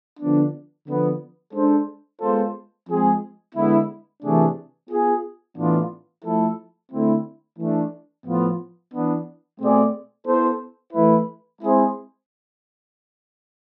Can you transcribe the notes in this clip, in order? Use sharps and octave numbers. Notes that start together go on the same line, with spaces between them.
D3 F3 B3 D4
D3 F3 B3
G#3 D4 A4 C5
G#3 B3 F4 A4 C5
F3 G#3 C4 G#4
D3 G#3 B3 E4
C3 E3 A3 D4 G#4
B3 F4 G#4
A2 E3 B3 D4 F4
F3 A3 E4 A4
D3 A3 C4 E4
E3 A3 D4
A2 F3 B3 F4
E3 B3 D4
B2 A3 C4 G#4 D5
B3 E4 A4 C5
E3 A3 E4 B4
G#3 C4 E4 G#4 C5